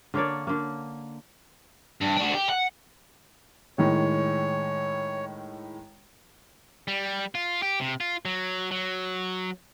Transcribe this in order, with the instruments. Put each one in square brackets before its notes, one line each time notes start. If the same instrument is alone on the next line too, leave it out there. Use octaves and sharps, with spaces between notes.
[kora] D3 A#3 C#5 D5
D3 A#3
[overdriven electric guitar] G2
D4 F#4
G4
F#5
[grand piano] A2 D#3 G#3 [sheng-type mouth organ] C#5
[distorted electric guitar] G3
F4
G4
C3
F4
F#3
F#3